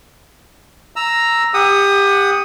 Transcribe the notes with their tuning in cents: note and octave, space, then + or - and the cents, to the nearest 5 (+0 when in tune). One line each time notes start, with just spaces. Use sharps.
A#5 +0 E6 +0
G4 +25 F#5 +0 D#6 +0